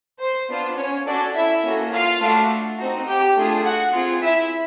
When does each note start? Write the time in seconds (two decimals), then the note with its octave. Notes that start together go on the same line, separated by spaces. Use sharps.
0.20 C5
0.48 B3 D4 F4
0.77 C#4 C#5
1.06 C#4 D4 F#4 A4 D5
1.35 E4 E5
1.63 A#3 C#4 F#4 A4
1.92 F4 F5
2.20 A3 D4 F#4 A4
2.78 C4 D#4 F#4
3.07 G4 G5
3.35 A3 D4 F4 G#4
3.64 F#4 F#5
3.93 C4 F4 G#4
4.22 E4 E5